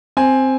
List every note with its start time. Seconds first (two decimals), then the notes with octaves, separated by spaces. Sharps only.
0.17 C4 G#5